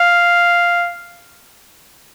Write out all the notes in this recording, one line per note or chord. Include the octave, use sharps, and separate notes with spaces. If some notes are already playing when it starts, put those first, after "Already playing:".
Already playing: F5